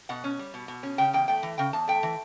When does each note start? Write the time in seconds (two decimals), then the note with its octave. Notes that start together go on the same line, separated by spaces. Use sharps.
0.09 B2 F#5
0.24 C#4
0.39 G3
0.54 B2
0.68 B2
0.83 C#4
0.98 C#3 G5
1.13 E2 G5
1.28 A3 G5
1.43 E3
1.58 C#3 G5
1.73 E2 A5
1.88 A3 G5
2.03 E3